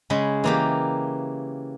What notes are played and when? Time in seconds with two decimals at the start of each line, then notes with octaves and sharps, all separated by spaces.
0.10 C#3 G#3 B5
0.44 E3 A#3 G4